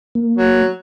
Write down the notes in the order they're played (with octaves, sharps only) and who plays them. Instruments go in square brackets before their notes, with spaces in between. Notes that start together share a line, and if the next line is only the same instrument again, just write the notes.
[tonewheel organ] A#3
[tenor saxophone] F#3